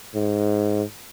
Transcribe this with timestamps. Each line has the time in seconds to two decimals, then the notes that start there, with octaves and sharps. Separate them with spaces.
0.15 G#2